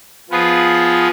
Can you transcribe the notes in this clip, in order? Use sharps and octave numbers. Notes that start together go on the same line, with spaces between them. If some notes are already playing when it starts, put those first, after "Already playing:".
F3 B3 F4 G#4 B4